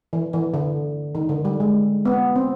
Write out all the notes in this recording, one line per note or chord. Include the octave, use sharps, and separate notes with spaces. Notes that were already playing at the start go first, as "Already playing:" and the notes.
E3
E3
D3
D#3
D3
G3
G#3
B3
C4